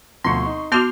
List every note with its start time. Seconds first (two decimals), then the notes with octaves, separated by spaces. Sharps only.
0.24 D2 B2 F3 C4 C6 C#6
0.45 D#4
0.72 B3 F#4 C6 D6 F6 G6 F7